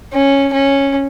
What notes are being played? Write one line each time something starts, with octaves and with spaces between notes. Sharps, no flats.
C#4
C#4